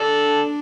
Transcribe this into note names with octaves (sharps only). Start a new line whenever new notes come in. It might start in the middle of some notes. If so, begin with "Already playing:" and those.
Already playing: A4 D5
D4